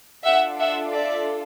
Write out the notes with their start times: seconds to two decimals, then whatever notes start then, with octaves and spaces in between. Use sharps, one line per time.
0.24 D4 F4 A4 E5 F#5
0.59 E5 F#5
0.92 D5 E5